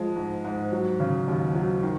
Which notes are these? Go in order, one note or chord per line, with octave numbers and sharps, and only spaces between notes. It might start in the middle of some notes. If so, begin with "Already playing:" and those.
Already playing: F3 G#3
G#2
G#2
F#3
C#3
D#2
F#3
D#3